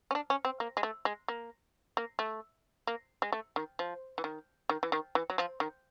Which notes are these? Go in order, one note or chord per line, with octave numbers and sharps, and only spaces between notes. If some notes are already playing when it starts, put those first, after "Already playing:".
C#4
D4
C#4
C4
A#3
G#3
A3
G#3
A#3
A#3
A3
A#3
G#3
A3
D#3
F3
E3
D#3
D#3
E3
D#3
E3
F#3
F3
D#3